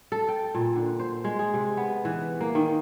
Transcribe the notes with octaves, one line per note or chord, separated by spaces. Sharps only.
A4
G5
A#2
D3
C5
G#3
G#4
C3
B3
E3
A#3
D#3